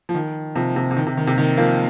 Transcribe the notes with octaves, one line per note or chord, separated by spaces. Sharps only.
F3
D#3
C3 F3
C3
C3
D#3
C3
D#3
C3
D#3
F3 A#3